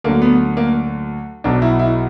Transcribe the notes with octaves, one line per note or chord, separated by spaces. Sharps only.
D2 D3 F#3 A#3
B3
A#3
B1 B2 F#3 D4
E4
E4